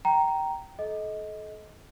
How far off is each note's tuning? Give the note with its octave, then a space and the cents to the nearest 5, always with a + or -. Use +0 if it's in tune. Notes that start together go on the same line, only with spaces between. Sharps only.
G5 -15 A#5 +0
A4 -35 D#5 +15